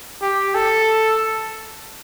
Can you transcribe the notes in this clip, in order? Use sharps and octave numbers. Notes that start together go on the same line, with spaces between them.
G4
A4